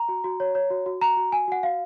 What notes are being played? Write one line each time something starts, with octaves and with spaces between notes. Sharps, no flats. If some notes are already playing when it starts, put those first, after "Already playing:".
Already playing: A#5
F#4
F#4
C#5
C#5
F#4
F#4
F#4 A#5
F#4
F#4 G#5
F#4 F#5
F#4 F5